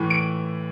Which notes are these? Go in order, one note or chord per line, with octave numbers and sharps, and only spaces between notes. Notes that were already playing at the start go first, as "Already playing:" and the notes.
Already playing: A2 E3
D7